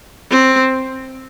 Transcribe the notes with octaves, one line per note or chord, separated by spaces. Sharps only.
C4